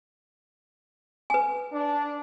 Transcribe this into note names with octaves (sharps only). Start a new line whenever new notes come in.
B4 G#5
D4